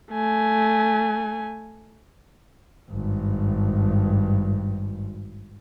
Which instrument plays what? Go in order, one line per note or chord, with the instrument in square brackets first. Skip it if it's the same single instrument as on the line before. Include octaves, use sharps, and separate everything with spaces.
[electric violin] A3 G#5
[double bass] G#1 G2